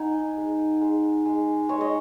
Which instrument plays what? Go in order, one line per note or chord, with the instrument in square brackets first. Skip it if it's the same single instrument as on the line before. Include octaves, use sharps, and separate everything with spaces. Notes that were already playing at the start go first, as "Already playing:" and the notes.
Already playing: [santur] D#4 F#5 G#5
G#3
G#3
G#3
G#3 C#5
D#5